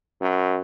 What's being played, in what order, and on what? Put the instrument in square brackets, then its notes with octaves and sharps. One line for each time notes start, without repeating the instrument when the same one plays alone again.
[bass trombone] F#2